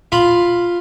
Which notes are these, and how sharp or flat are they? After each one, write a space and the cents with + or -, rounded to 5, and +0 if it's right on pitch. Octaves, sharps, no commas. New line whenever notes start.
F4 +0 B5 +0